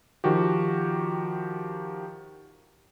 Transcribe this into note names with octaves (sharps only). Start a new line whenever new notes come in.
D#3 F3 F#4 G4